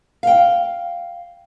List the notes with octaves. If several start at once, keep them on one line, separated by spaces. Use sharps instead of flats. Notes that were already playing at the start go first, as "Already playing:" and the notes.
F5 G5